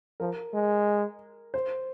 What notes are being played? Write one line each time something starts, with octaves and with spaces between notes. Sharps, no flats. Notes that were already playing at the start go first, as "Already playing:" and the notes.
F3 A#4
G#3
C5